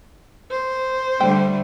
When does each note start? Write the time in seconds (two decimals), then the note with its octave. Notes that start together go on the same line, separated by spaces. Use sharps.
0.51 C5
1.21 D3 G3 A3 G5